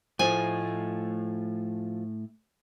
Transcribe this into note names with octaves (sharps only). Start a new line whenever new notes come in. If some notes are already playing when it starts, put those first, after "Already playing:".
A2 F3 A3 D#5 G#5